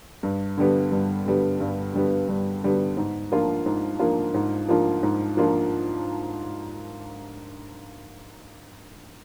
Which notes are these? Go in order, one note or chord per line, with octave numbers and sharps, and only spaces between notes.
G2
D3 G3 B3
G2
D3 G3 B3
G2
D3 G3 B3
G2
D3 G3 B3
G#2
F3 A#3 D4 F4
G#2
F3 A#3 D4 F4
G#2
F3 A#3 D4 F4
G#2
F3 A#3 D4 F4